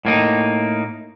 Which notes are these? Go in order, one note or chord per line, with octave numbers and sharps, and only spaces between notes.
A2 A#3 D#4